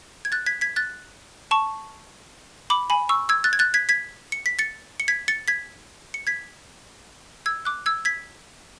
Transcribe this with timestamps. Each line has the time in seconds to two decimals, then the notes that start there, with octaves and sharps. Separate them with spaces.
0.25 G#6
0.32 F#6 A6
0.46 G#6 B6
0.61 G#6 B6
0.76 F#6 A6
1.51 A5 C#6
2.70 B5 D6
2.90 G#5 B5
3.09 C#6 E6
3.29 E6 G#6
3.44 F#6 A6
3.53 G#6
3.59 F#6 A6
3.74 G#6 B6
3.89 G#6 B6
4.32 C#7
4.46 B6
4.59 A6 C#7
5.00 C#7
5.08 G#6 B6
5.28 A6 C#7
5.48 G#6 B6
6.14 C#7
6.27 G#6 B6
7.46 E6 G#6
7.65 D6 F#6
7.86 E6 G#6
8.05 G#6 B6